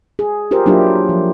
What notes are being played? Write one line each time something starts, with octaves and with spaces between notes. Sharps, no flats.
G#4
F4 G4 A#4 C5
F#3 A#3 D4 E4 F4 G4
F3